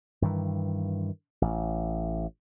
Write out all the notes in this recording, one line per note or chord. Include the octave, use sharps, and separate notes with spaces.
G2 D#3 E3
A1